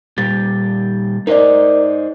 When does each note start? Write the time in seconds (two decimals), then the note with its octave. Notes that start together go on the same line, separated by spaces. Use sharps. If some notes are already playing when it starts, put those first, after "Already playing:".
0.18 A#2 G3 G4 A6
1.27 D#4 A#4 C5 D5 D#5